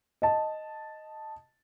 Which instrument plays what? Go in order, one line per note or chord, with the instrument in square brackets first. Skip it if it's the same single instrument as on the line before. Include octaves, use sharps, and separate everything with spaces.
[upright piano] D#5 A5